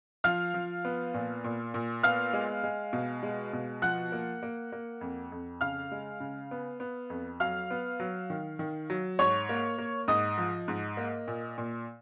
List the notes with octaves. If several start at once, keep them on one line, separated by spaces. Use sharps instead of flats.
F3 F5 F6
F3
B3
A#2
A#2
A#2
B3 F5 F6
G#3
G#3
B2
G#3
B2
F3 F#5 F#6
A#3
A#3
A#3
F2
F2
C#3 F5 F6
G#3
C#3
B3
B3
F2
F#3 F5 F6
B3
F#3
D#3
D#3
F#3
G#2 C#5 C#6
A#3
A#3
G#2 D#5 D#6
F3
G#2
A#3
A#2
A#2